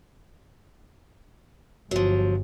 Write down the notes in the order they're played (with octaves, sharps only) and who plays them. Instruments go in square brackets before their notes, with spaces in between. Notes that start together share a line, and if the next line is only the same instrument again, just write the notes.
[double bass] G1 [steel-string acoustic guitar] F3 F#3